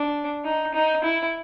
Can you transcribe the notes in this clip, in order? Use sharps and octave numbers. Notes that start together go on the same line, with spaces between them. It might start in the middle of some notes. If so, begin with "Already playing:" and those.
Already playing: D4
D#4
D#4
E4